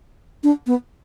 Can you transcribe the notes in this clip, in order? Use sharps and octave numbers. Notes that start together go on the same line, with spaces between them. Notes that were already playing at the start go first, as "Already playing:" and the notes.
D4
B3